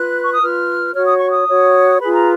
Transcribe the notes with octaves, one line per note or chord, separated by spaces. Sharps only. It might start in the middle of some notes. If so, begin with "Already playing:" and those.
Already playing: F4 B4 F#6
C#6
D#6
F4 B4 F6
F#4 C#5 F6
D#6
C#6
D#6
F#4 C#5
F4 G#4 B4 B5
A#5